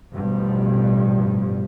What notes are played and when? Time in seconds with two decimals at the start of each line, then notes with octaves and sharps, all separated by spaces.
0.14 A1 G2 B2 F3